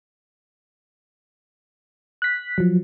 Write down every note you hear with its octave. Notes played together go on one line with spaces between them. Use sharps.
F#6 B6
F3 F#3